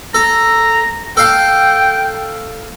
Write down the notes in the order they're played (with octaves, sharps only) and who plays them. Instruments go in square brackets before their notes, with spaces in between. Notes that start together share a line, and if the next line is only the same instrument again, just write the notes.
[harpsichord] A4 [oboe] A#5
[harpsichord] A4 F5 A5 [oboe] G5